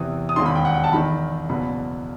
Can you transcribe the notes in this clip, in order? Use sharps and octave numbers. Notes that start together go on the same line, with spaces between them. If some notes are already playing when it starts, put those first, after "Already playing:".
Already playing: E2 C3 E3 D#6
D#6
E1 D#2 D#3 C6
B5
G5
F#5
G5
A5
E1 E2 D#3 B5
F#1 E2 B2 F#3 B5